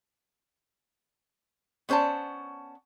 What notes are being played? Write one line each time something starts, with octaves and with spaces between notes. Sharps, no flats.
B3 C#4 C5 D5 A5